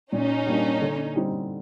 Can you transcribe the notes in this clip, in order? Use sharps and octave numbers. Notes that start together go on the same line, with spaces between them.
A#2 C#4 D#4
G3 A#3 D4
D3
G3 C4 D#4